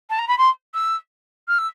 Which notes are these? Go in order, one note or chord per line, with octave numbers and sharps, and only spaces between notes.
A5
A#5
B5
C6
E6
F6
E6